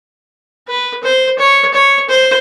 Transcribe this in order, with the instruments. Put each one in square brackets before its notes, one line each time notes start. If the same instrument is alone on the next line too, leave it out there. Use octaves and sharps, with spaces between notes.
[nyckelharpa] B4
C5
C#5
C#5
C5